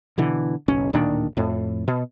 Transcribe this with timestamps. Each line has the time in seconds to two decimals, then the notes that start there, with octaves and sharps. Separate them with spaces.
0.18 B2 D3 E3
0.68 F#1 B1 C#4
0.93 D1 A#2 D#3 D4
1.37 F2 A2
1.88 B2